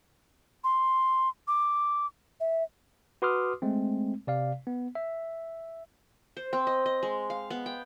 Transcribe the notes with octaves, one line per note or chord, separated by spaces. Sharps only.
C6
D6
E5
F#4 B4 C6 D6 D#6 F6
G#3 A3 C4
C3 D5 F5
B3
E5
C5
C4
D#5
D#5
G#3
F5
B3
G5